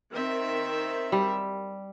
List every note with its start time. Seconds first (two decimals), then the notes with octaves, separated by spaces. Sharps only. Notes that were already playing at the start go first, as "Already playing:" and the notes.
0.11 D#3 C4 E5
1.12 G3